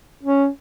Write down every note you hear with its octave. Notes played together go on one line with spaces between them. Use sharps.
C#4